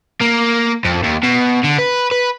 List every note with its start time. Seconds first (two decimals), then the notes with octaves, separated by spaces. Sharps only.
0.21 A#3
0.84 F2
1.03 D#2
1.23 B2
1.64 D3
1.79 B4
2.11 B4